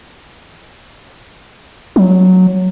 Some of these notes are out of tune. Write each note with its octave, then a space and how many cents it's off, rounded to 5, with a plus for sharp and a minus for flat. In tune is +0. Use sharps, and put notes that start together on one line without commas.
F#3 -5